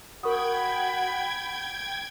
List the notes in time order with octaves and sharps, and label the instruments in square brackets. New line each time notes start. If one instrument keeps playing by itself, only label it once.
[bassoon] F#4 [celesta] A#4 C#6 D#6 [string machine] G5 G#6 [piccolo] B5